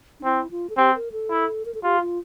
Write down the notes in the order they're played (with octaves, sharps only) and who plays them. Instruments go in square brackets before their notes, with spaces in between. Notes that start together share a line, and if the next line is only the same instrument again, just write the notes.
[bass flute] D4
[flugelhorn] C4 [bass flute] E4
[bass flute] F4
A4
[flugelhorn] C4 [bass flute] G4
[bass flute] A#4
A4
[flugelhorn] E4
[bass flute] A#4
A4
[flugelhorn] F4 [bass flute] G4
[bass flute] F4